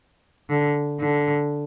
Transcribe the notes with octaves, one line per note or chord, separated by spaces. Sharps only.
D3
D3